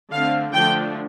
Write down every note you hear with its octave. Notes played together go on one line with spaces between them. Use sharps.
D3 A3 C4 F5
D3 F3 A3 D4 G5